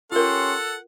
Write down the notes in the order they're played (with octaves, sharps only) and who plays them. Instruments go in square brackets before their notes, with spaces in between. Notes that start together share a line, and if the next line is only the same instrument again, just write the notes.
[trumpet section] C#4 G4 C6 [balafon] F4 A#4 [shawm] A4 [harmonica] F#5